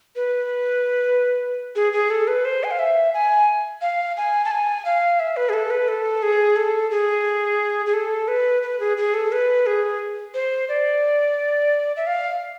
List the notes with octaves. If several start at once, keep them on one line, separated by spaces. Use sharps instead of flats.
B4
G#4
G#4
A4
B4
C5
G#5
F5
E5
G#5
F5
G#5
A5
G#5
F5
E5
B4
G#4
A4
B4
A4
G#4
A4
G#4
G#4
A4
B4
B4
G#4
G#4
A4
B4
G#4
C5
D5
E5
F5